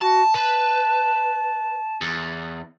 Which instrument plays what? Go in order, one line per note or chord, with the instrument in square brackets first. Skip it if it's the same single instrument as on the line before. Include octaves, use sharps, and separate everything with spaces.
[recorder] F#4 [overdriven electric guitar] A5
[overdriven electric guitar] B4 [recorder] A5
[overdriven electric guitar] E2